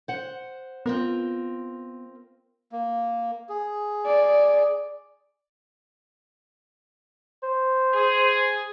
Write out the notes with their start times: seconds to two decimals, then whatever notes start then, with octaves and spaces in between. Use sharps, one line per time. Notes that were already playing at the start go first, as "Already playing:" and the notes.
0.08 C5 F#5
0.86 B3 C4 F4 A#4
2.72 A#3
3.49 G#4
4.05 D5
7.43 C5
7.93 G#4